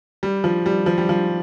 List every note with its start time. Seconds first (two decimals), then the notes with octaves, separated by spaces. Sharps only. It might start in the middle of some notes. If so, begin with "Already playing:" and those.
0.23 G3
0.44 F3
0.66 G3
0.86 F3
0.98 G3
1.09 F3